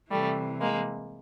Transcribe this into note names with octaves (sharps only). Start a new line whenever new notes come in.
C3 E3 G3 A3
G#3 A#3